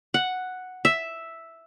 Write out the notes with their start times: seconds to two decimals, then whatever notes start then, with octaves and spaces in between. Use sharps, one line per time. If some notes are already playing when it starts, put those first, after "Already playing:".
0.14 F#5
0.85 E5